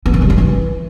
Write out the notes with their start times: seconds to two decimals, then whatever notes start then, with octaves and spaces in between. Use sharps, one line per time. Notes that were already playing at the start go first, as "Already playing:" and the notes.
0.06 B3
0.14 D#3
0.22 G3
0.30 D#3
0.38 E3